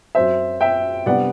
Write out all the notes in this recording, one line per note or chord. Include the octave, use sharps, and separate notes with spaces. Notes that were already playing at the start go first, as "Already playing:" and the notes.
F#2 F#3 C4 C5 E5
E5 G5
C3 G3 B3 D4 D5 F#5